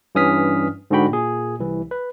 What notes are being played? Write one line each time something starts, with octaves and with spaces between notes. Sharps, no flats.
G2 E3 C#4 D#6 F6 B6
G#2 D3 D4 F#4 G5 B5
A#2 G#4
C2 E3
B4